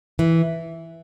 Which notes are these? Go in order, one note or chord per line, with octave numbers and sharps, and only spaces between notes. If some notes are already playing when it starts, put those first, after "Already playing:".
E3